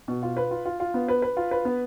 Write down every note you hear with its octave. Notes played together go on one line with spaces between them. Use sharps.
B2
F4
B4
F4
F4
F4
B3
B4
B4
F4
B4
B3